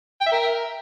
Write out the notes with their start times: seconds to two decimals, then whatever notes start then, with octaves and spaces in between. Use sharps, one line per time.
0.21 G5
0.26 E5
0.32 A#4